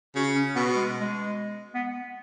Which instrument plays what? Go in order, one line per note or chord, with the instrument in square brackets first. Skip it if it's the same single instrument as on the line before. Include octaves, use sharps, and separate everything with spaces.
[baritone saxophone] C#3 [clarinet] F#4
[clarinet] C#4
[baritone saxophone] B2 [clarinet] B3
[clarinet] G#3
G#3
B3